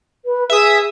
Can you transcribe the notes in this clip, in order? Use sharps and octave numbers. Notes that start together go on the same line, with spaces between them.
B4
G#4 E5 D#6